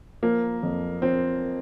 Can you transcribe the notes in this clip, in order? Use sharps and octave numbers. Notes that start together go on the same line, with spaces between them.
F3 A#3
F2
F3 C4